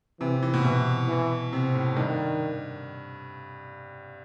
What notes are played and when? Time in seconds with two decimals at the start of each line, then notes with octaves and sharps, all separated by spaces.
0.20 C3 E3
0.43 E3
0.54 B2
0.64 B2 E3
1.08 E3
1.53 C3
1.74 A2
1.97 G2 D#3